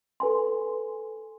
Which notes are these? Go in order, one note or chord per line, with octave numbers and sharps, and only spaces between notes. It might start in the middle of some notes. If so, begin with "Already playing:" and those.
A4 B4 G#5 C6